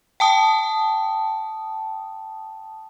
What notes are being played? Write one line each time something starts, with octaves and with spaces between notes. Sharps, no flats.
G5 A5 D#6